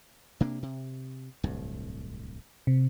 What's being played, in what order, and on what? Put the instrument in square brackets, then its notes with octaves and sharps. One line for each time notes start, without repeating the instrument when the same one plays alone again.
[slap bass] C3 A#3 D4
C3
D1 C2 G2
[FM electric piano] C3